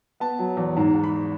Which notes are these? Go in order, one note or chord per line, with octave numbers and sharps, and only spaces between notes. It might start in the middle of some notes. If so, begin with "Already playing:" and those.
B3 A5
F#3
E2
G#2
G#2
B5